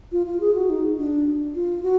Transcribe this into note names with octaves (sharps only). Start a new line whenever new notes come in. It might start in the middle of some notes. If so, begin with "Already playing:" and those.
F4
F4
G#4
F#4
D#4
D4
F4
F#4